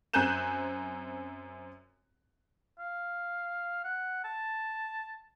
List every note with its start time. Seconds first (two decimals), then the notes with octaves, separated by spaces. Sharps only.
0.13 F#2 C4 G#5 F#6 G6 E7
2.79 F5
3.84 F#5
4.24 A5